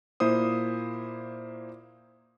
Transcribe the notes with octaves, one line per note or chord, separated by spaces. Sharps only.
A#2 A#3 E4 C5 D#6